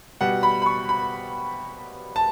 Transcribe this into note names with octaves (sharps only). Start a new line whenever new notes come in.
B2 G3 F#5
B5
B5
C#6
B5
A5